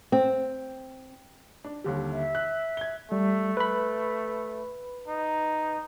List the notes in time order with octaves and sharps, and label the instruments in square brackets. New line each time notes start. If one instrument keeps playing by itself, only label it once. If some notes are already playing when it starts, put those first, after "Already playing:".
[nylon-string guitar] C4
[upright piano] D4
D#2 D3 G3
[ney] E5
[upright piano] F#6
G#6 G7
[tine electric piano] G3 [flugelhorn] A3
[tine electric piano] B4 B5
[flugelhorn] D#4